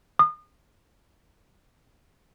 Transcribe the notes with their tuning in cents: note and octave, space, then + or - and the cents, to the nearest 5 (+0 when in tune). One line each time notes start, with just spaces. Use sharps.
D#6 -35